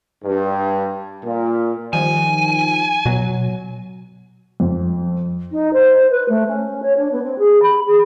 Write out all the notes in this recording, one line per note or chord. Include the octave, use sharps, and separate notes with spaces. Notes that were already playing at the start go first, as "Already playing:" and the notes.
G2
A#2
D#3 F3 G3 G#5
B2 F#3
F2
D#4
C5
B4
A3
C#4
C#5
D4
B3
C4
G#4
B5
G#4